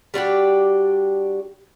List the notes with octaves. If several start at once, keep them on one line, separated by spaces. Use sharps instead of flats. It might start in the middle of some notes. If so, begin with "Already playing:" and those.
G3 D4 F#4 G4